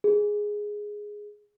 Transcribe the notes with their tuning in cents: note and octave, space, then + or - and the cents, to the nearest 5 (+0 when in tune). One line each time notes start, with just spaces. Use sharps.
G#4 +0